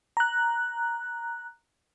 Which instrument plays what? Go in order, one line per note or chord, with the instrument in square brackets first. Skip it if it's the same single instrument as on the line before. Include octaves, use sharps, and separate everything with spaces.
[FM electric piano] A#5 F#6